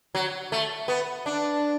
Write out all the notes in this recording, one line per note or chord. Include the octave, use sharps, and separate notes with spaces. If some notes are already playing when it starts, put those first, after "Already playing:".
F#3
A3
B3
D4